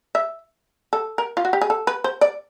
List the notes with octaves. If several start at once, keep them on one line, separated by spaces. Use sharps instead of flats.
E5
A4
A#4
F4
F#4
G4
G#4
A4
B4
C5
D5